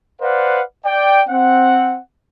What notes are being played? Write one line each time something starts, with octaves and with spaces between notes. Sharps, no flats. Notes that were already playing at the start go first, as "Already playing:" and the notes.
B4 C5 D5 F5 F#5
D5 G5
C4 F#5